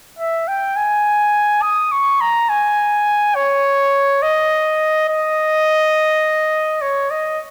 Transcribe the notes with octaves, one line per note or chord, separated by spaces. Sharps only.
E5
G5
G#5
D#6
C#6
A#5
G#5
C#5
D#5
D#5
C#5
D#5